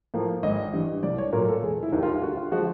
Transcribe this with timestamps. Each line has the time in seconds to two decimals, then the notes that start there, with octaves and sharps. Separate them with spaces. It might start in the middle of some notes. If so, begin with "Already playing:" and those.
0.14 A2 F3 A#3
0.43 G#1 D#5
0.73 G2 E3 G3
1.03 C2 D5
1.18 C#5
1.33 A#2 F#3 A3 A#4
1.48 A4
1.63 E1 G#4
1.83 E4
1.92 D#2 D#3 G3
2.03 F4
2.22 D2 F#4
2.37 F4
2.52 D3 F3 G#3 F#4